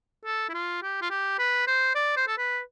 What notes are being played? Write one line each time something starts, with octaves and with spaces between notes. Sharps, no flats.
A4
E4
F4
G4
F4
G4
B4
C5
D5
C5
A4
B4